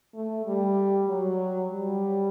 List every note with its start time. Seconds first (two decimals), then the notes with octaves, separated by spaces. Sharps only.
0.15 A3
0.46 G3
1.09 F#3
1.72 G3